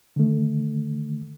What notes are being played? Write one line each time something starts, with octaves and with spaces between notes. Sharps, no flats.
D3 D#3 A3